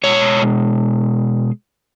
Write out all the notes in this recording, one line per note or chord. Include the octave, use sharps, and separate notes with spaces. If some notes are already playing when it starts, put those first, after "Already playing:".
B2 G#3 C#5